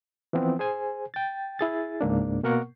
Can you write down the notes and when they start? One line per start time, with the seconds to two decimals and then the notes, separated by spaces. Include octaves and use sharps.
0.33 E3 F3 B3 C4
0.59 G#4 C5 G#5
1.14 G5 A6
1.59 E4 G#4 A6
2.01 C#2 G#2 A#3 D4
2.43 B2 A#3 B3 A#4 F#5 C#6